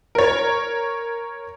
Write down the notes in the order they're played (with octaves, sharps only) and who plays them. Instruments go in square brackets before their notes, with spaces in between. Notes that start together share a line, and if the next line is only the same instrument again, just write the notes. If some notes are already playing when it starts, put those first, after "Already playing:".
[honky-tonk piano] A#4 C#5